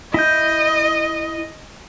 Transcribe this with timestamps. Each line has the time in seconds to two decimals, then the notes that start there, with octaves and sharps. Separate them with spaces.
0.14 E4 D#5 G6